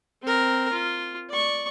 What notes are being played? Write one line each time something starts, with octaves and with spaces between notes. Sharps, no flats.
C4 A#4
F4
D5 C#6